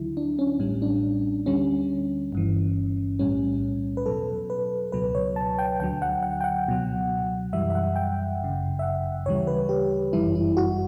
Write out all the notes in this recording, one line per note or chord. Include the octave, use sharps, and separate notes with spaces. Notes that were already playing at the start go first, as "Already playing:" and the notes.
Already playing: D2 D3 F#3 E4
D4
C#4
A1 A2 G3 C#4
D4
D2 D3 G3 C#4
G1 G2 E3
B1 A2 G3 C#4
B4
E2 B2 F#3 A4
B4
C#2 B2 F#3 B4
C#5
A5
G5
D2 D3 F#3 G5
F#5
F#5
G5
F#5
C#2 B2 F#3
F#2 E3 G3 E5
E5
F#5
G5
G1 F#2 C#3
E5
F#5
D2 C#3 E3 G3 C#5
B4
G4
G1 F#2 E3 G3 E4
E4
F#4